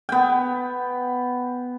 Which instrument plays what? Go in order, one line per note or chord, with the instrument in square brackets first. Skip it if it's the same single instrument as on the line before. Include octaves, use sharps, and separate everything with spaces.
[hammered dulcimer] B3 G5